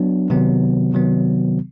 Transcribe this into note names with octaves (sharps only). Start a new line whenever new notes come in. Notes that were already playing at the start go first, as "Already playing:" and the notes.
Already playing: F#3 B3 D4
C3 D#3 F#3 B3
C3 D#3 F#3 B3